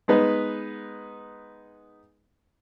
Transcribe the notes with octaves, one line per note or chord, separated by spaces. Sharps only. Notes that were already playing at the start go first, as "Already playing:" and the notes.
G#3 B3 D#4 B4